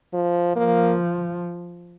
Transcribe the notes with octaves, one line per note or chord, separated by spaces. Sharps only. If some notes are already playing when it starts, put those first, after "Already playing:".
F3
F3 A#3